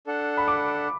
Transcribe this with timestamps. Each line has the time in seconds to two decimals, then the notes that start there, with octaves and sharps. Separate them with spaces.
0.07 D4 A4 F#5
0.37 B5
0.48 D6